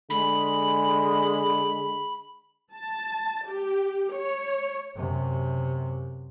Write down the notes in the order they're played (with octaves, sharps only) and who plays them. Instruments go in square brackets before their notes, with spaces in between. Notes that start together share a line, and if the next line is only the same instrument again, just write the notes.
[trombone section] D3 G#3 [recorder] B5
[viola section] A5
G4
C#5
[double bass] F#2 C3